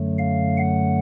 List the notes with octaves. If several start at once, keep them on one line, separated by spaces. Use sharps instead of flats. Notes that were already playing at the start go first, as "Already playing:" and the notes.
Already playing: F#2 D3 F#3 A3
F5
F#5